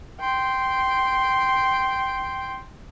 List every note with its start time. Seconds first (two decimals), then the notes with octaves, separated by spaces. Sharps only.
0.21 G5 C6